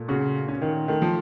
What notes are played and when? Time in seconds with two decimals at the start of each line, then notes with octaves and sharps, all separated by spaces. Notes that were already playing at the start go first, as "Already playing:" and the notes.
Already playing: A#2 A3
0.08 C#3 F#4
0.48 C#4
0.62 D#3
0.88 D#3 A3
1.02 F3